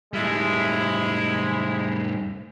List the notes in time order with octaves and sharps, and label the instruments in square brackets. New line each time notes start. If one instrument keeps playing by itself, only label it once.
[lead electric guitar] A2 G3 [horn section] G#3 E4